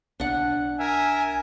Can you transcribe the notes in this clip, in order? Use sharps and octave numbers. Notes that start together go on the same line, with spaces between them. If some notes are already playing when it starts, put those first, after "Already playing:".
B1 D4 F#5
A#4 E5 G#5